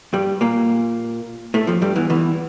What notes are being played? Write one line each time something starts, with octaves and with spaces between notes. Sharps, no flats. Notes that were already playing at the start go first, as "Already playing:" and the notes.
G2 G3
A#2 A#3
A2 A3
F2 F3
G2 G3
E2 E3
E2 E3